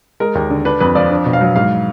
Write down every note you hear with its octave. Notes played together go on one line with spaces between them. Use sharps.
G#3 A#4
D#2
D3
D4 B4
F2 B4
F3 D5
D4
B2
F5
F#3
G#2 F5